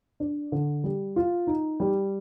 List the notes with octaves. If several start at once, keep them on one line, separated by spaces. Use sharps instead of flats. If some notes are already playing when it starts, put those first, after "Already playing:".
D4
D3
G3
F4
D#4
G3